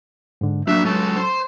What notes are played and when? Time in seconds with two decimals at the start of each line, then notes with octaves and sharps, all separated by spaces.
0.41 G#2 D3
0.68 F#3 A#3 D4 E5
0.85 G#3 C#4 A4
1.17 C5 C6